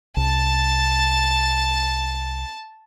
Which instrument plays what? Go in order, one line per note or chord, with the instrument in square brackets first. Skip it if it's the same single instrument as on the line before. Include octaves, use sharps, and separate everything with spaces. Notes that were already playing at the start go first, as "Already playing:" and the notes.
[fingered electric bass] C2 [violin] A5 A6